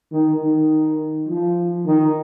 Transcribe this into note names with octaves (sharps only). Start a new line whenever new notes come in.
D#3
D#3
F3
D#3